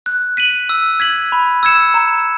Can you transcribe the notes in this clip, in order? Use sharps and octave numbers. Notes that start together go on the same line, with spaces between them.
F#6
B6 D#7 F#7
E6
G#6 B6 F#7
B5
E6 G#6 C#7 E7
A#5